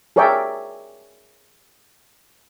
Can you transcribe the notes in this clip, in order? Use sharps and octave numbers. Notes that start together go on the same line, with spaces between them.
G#4 A#4 C#5 D5 E5 G5